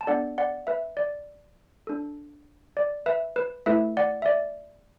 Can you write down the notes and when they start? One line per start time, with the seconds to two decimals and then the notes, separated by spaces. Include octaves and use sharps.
0.01 A5
0.07 B3 D4 A4 D5 F#5
0.38 D5 F#5
0.67 B4 E5
0.97 D5
1.87 D4 A4
2.77 D5
3.06 B4 E5
3.36 B4
3.66 A3 E4 A4 B4 E5
3.97 D5 F#5
4.22 E5
4.26 D5